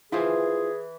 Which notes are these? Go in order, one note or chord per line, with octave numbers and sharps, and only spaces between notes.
E3 E4 F4 G#4 C5